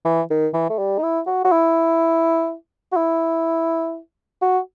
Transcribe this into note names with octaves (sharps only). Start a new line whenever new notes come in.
E3
D#3
E3
A3
G3
D#4
E4
F#4
F#4
E4
F#4
E4
F#4